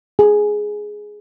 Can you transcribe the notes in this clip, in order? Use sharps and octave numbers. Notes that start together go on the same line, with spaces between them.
G#4